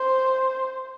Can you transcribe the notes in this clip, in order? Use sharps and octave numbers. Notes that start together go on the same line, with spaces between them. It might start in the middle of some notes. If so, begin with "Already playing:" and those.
Already playing: C5